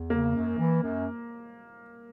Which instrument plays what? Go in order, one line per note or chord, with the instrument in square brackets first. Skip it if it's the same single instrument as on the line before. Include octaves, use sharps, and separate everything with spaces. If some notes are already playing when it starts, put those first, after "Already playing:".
Already playing: [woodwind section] E2
[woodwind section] C#3 [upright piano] A#3
[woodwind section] F#2
E3
F#2